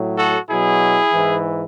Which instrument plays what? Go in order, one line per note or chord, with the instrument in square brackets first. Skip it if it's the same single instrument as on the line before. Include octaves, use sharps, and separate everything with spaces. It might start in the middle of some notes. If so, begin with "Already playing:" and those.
Already playing: [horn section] A2 F#3
F#4 A4
B2 F#3 E4 G#4
G#2 E3